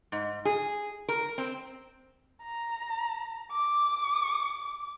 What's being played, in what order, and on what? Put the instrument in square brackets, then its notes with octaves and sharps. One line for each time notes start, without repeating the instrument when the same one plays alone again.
[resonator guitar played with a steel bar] G#2
G#4
A#4
C4
[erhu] A#5
D6